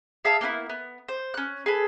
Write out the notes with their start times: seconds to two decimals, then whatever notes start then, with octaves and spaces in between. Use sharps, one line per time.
0.25 G#4 E5 F5 A5
0.41 A#3 B3 D4 E4
0.69 B3
1.08 C5
1.34 C#4 F#6
1.66 G#4 A4 B4